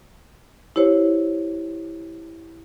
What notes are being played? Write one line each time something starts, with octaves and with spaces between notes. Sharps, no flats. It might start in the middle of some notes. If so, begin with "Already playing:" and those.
E4 G4 C5 C#5